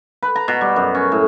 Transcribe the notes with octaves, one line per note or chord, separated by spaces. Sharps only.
B4
A#5
B2
G3
F#2
C#4
A2